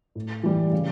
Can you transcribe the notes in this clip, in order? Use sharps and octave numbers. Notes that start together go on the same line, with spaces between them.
A2
E3 G3
C#3